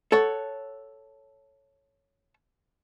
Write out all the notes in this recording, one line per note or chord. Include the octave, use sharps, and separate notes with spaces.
A4 C#5 F#5